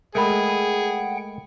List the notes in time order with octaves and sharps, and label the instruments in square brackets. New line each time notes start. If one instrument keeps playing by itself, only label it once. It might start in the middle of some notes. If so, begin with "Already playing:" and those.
[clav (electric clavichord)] G#3 A3 [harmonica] G#4 [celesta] A#4 B5 [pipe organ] F#5 G5